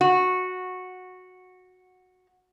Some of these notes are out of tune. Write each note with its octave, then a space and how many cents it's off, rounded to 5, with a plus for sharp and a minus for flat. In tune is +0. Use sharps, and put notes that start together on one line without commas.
F#4 -10